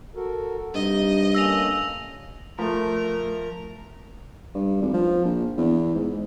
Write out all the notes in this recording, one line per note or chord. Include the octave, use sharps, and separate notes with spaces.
F#4 A4 A#4
G2 C3 D#4 D#5
A3 A#3 C#4 E6 A#6 F7
F3 A3 A#4
G2
G#1
F3
A#1
E2
G#2